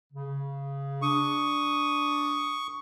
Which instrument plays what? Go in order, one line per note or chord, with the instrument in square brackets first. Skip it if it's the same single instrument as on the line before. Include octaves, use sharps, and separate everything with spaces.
[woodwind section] C#3
[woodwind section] D4 D#6 [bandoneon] C#6